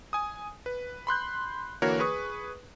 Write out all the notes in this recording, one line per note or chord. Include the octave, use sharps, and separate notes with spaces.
G#5 D#6
B4
B5 C6 F#6 G6
D3 E3 A#3 F#4 A#4 C#5
G#4 B4 C#6 D#6